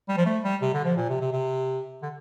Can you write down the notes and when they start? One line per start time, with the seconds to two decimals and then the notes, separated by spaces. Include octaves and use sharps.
0.09 G3
0.17 F3
0.26 A3
0.44 G3
0.62 C3
0.73 D3
0.85 F3
0.97 A#2
1.09 C3
1.20 C3
1.32 C3
2.02 D3